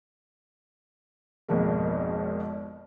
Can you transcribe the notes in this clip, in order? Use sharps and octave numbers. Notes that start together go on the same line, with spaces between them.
G#1 F2 B2 F3 G#3 A#3